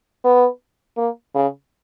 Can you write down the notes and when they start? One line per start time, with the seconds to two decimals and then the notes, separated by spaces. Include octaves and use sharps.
0.24 B3
0.97 A#3
1.35 C#3